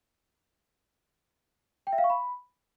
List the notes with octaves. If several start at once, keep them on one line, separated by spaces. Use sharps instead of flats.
G5
E5
F5
C#6
B5